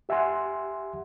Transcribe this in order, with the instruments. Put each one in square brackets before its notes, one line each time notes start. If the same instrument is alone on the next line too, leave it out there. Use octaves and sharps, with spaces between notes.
[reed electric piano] G4 E5 F#5 G#5 C6